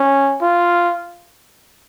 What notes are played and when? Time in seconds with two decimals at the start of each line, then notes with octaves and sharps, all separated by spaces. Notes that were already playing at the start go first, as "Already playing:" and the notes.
Already playing: C#4
0.41 F4